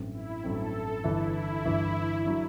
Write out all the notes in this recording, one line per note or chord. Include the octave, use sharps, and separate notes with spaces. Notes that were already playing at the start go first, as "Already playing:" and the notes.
Already playing: A1 G2 F#3 A3 C4
E4
A1 G2 F#3 A3 C4 A4
G1 G2 E3 E4
G1 G2 E3
D3 F#3